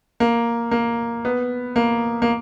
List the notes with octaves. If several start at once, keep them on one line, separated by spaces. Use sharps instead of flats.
A#3
A#3
B3
A#3
A#3